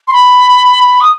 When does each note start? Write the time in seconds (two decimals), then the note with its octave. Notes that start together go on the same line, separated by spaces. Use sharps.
0.08 C6
0.13 B5
1.01 D#6